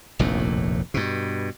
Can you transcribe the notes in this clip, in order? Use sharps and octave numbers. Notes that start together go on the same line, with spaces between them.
F1 A#1 D#2 A2
G2 B2